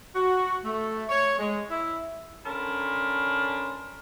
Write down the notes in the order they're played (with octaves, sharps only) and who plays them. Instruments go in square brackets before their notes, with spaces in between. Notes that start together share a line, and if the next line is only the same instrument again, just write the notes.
[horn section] F#4
A3
C#5
G#3
E4
D3 C#4 A#4 A5 B5 C6